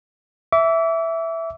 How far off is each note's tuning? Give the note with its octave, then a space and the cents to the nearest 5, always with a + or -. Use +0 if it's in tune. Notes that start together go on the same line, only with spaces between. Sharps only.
E5 +0 D6 -35